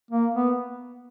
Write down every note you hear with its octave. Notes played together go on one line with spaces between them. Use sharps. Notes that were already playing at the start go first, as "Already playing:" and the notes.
A#3
B3